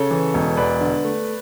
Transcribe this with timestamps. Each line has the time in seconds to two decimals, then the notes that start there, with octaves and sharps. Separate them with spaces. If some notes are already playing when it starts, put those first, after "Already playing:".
Already playing: C#3 A4 C#5
0.11 E3
0.34 E1
0.57 E2 B4 D5
0.81 D3
1.04 A3